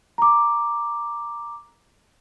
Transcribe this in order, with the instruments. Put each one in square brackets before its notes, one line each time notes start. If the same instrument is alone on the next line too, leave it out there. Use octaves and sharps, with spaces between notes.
[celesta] A#5 D6